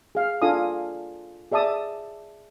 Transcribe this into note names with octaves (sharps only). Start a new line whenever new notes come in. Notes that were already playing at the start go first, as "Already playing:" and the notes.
G#4 F5
D4 F4 A4 F5 G#5 D#6
G#4 D5 E5 A5 D#6